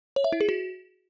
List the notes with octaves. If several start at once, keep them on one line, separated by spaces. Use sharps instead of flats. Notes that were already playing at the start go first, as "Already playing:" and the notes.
C#5
E5
E4
G#4
F#4